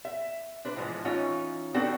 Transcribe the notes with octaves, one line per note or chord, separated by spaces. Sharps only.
E5
D4 B4 C5
A2 E3 F3 G#3
E3 C#4 D#4 F4 C#5
B3 C4 D4 D#4 F#4 A4